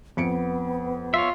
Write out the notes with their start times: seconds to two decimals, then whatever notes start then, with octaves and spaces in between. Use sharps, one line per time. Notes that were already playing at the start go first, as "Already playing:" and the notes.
0.17 F2 B3 C#7 D7
1.14 F4 C#5 E5